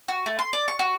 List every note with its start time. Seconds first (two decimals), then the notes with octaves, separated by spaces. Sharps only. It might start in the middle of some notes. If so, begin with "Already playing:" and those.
0.08 F#4
0.26 A3
0.39 C6
0.53 D5
0.68 C#6
0.79 F#4